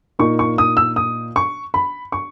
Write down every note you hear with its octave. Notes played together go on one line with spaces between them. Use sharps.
A#2 A#3 D#4 C#6
C#6
D#6
E6
D#6
C#6
B5
C#6